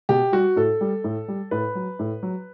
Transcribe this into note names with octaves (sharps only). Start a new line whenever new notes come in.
B2 G4
G3 F#4
A2 A4
G3
A2
G3
A2 B4
F#3
A2
F#3